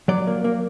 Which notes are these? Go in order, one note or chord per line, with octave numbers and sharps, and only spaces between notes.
F#3 D5
A#3
A#3